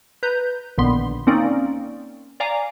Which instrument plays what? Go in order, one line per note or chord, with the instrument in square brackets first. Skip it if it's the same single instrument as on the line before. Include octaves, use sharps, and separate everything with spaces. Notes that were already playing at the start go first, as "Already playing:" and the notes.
[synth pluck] B4 A#5 G6
A#1 A#2 D3 D#3 B3 C6
A#3 C4 C#4 D#4 A#4 D5
D5 F5 G#5 A#5 D6